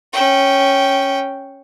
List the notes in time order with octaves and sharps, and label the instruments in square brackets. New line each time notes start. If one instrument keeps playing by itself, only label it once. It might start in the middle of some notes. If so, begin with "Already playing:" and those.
[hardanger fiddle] C#4 G5